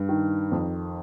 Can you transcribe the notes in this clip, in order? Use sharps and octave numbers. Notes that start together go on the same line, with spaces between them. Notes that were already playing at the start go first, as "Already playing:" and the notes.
Already playing: G2
D#3
F2